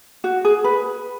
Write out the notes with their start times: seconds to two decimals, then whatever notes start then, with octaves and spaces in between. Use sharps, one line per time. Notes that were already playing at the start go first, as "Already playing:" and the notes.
0.24 F#4
0.45 G#4
0.64 B4